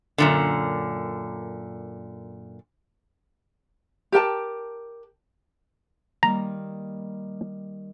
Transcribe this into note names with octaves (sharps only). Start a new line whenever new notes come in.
F#2 A#2 D3
G4 A#4 G5 A5
D#3 G3 A#3 A#5